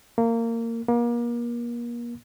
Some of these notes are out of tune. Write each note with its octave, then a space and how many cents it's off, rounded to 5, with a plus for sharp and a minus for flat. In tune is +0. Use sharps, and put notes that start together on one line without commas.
A#3 -20
A#3 +35